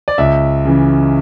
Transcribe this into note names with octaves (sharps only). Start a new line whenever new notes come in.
D5
C#2 E5
C#3 E3